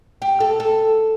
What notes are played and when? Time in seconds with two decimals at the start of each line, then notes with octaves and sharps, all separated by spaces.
0.22 G4
0.40 A4
0.60 A4